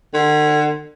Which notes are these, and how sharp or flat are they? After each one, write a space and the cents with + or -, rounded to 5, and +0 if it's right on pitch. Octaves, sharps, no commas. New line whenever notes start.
D3 +40